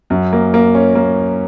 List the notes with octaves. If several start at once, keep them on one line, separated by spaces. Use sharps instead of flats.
F#2
A#3
A#3
C#4
A#3